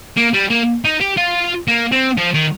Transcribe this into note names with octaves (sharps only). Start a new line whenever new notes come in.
A#3
G3
A#3
D#4
G4
F4
A#3
C4
F3
D#3